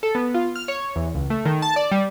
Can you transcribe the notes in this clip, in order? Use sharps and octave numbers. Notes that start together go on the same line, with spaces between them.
A4
B3
F4
F6
C#5
E2
C#2
A3
D#3
A5
D5
G3